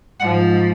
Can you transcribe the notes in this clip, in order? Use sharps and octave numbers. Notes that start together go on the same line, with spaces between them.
G#2 F3 F#5